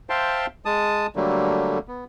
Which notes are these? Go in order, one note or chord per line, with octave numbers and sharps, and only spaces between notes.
C5 E5 F5 G5 A5 C6
G#3 A5 D#6
D3 F#3 G3 A3 A#3
B3